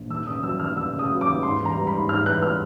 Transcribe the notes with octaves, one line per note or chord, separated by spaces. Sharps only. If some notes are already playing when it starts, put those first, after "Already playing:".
Already playing: A#1
D#2 E6
C#3 D#6
F#3 E6
D#2 F6
D#2 E6
C#3
D#6
F#3
D6
D#2
G#2 C6
E3
A#5
G3
B5
G#2
G#2 F6
E3 F#6
G3 F6